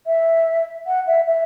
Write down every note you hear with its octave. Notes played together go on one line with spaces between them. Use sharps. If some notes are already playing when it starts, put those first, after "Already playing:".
E5
F#5
E5
E5